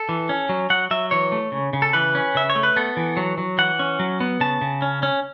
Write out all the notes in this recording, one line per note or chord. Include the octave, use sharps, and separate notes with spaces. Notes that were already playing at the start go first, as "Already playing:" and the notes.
Already playing: A4
E3
C#4
F#3
F#3 F#5
F#3 E5
E3 C#5
A3
C#3
C#3
A4
E3 B4
C#4
C#3 E5
C#5
A3
B4
B3 A4
E3
F#3
F#3
E3 F#5
C#4
F#3
B3
C#3 A5
C#3
C#4
C#4